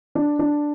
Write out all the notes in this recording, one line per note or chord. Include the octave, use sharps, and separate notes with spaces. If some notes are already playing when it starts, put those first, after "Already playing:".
D4
D4